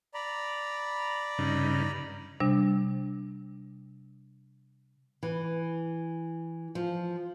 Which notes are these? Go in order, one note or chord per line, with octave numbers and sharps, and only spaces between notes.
D5 A#5 B5
G2 C#3 D#4
C3 G3 D4
E3
F3